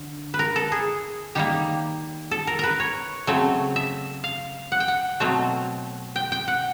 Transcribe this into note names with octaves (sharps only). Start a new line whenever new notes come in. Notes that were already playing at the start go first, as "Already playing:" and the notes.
Already playing: D3
B4
A#4
A4
G#4
D#3 G3 A#3 G4
A4
A#4
A#4 B4
C#5
C#3 F#3 A3 C4
E5
F5
F#5
G5
F#5
B2 F#3 A3 C4
G5
G5
F#5